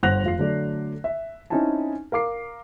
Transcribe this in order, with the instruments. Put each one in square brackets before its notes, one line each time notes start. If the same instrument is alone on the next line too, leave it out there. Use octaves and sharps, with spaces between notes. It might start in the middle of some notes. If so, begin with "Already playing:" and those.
[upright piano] G1 C5 F#5 F#6 A#6 F7
F1 F4 C7
D3 F#3 A3 D5
E5
C4 C#4 D#4 E4 G#5 A5
A#4 F5 D6 C7